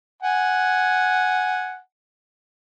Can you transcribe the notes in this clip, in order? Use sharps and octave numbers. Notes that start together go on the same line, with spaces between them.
F#5 G#5